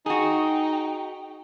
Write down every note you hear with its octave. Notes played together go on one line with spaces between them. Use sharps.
D#4 F#4 G#4 G5